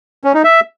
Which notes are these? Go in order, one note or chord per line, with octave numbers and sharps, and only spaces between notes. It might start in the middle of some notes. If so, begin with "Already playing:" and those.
C#4
D#4
E5